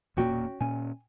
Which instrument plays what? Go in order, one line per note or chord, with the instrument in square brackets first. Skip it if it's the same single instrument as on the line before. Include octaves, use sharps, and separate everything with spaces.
[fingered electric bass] E1 A#2 A#3 [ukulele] C#4 F#4 G5
[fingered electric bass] A#2 C#4 [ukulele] G#5